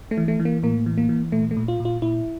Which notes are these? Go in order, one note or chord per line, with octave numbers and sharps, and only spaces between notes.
A3
E3
A3
E3
A#3
A2 A#3
E3
A#3
E3
A#2 A3
A3
A#2
F4
A#2
F4
A#2 E4